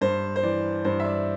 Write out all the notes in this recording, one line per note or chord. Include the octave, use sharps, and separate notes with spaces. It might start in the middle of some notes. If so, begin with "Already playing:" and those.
G2 C5
C5
E3 D5
G2 C5
E5
D5